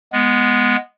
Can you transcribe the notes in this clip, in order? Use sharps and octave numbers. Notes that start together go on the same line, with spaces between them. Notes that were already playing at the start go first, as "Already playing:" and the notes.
G#3 B3